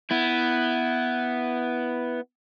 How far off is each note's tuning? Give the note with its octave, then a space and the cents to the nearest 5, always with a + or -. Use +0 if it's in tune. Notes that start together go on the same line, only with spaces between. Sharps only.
B3 +0 E4 +0